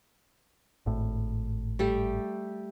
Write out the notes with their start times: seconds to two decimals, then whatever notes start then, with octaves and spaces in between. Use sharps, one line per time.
0.86 G#1 A2
1.79 G3 A3 G4